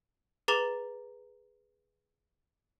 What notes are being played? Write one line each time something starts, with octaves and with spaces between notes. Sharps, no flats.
G#4 B4 A#5 D6 A6 F7